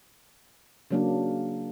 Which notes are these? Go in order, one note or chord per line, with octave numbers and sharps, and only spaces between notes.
C#3 F#3 A#3 D4